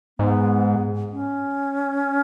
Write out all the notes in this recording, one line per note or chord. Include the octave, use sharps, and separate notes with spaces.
G#2 B3
C#4